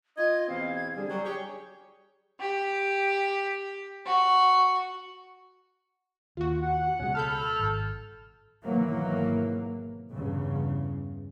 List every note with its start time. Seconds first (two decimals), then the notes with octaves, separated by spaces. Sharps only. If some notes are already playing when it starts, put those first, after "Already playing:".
0.18 F4 D#5 G#6
0.48 E2 B2 C4 F5
0.75 G#6
0.96 D3 G3 G#4
1.09 F#3 G3
1.24 G4 C#5
2.40 G4
4.06 F#4
6.37 D#2 F4 F#4
6.63 F#5
6.99 C#2 B2 G#3 C#4
7.15 A4 A5 B5 F6 G6
7.59 G#1
8.64 G#1 B2 E3 F#3 A#3
10.13 E2 G2 C#3